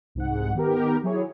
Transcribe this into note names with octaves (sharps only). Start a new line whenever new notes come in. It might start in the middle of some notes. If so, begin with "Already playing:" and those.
C2 G#2 F#5
D#3 B3 G4 A#4
F#3 E4 G#4 C#5